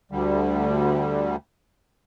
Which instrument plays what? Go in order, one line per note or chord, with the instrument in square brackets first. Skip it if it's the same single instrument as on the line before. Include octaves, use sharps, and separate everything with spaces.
[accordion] D2 D3 G3